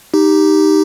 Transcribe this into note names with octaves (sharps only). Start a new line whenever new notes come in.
D#4 G4